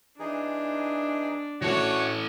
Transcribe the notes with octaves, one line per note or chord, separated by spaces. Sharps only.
E3 D4 D#4 G#4
E3 A3 F#4 A4 C#5 D5